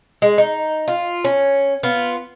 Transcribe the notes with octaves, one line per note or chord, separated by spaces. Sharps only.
G#3
D#4
F4
C#4
B3 F4